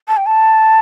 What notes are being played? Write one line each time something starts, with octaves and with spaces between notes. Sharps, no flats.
A5
G5
A5